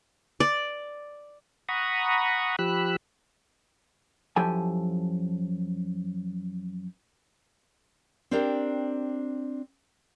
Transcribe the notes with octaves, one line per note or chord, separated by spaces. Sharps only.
D5
F#5 A#5 B5 C#6 D#6
F3 G4 B5 E6 F#6
F#2 F3 E4 G4 A4 G#5
C4 D4 G4 A#4 D5 G5